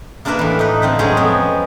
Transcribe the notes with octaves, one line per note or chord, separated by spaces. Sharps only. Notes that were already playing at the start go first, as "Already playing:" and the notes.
A#3 D4 F4 A#4 B4 E5
A2 E3
D#4 B4
D3 C4 F4
F#3 G#3 C4 C#4 G#4 C5
F2 B3 C#5